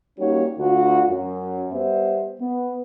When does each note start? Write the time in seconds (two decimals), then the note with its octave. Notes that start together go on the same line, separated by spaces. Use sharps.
0.18 G3 A#3 C#4 D#4 F#4 C#5
0.58 D2 F4 F#4
1.08 F#2
1.72 G3 B3 C5 E5
2.40 B3